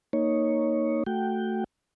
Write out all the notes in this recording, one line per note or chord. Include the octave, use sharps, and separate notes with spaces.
A#3 D#4 C#5
A3 F#4 G5